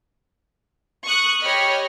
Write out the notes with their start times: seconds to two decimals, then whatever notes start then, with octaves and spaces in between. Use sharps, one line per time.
1.04 C#6 D#6 F#6
1.42 G4 C#5 D#5 B5 F6